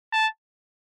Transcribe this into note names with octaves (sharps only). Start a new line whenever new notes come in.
A5